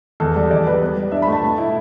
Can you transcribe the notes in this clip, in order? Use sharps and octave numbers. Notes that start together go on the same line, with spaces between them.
E2 A4
G3
E2 D5
G3 B4
B3
G3
D4 E5
B5
A3
A5
B2
E4